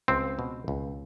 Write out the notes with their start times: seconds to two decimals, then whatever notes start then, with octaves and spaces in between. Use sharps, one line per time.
0.08 C#2 C4
0.39 B2
0.68 C#2